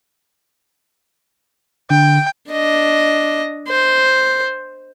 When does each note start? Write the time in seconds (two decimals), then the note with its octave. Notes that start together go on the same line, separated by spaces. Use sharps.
1.90 D3 G5
2.50 D4 D#5
3.68 C5